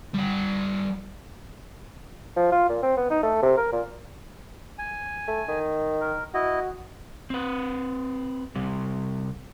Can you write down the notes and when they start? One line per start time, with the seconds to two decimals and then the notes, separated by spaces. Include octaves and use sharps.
0.14 G3 F#5
2.37 F3
2.52 F4
2.69 A#2
2.83 C4
2.97 B3
3.10 D#4
3.23 A3
3.42 C3
3.57 A#4
3.73 A#2
4.78 G#5
5.28 A3
5.48 D#3
6.01 A#4
6.34 E4 F#4 D#5
7.30 C4 B4
8.55 C3 G3